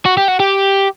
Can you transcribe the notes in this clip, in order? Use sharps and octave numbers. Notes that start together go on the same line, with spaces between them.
F#4
G4
F#4
G4